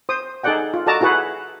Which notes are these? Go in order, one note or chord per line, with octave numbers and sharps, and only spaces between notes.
C5 D#6
D#4 G#4 A4 D5 F#5 G5
F4
F#4 A4 D5 D#5 A5 A#5
E4 F#4 G#4 B4 F#5